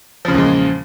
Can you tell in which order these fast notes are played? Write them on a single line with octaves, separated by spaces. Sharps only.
F3 C#3 E2 A#2 G#3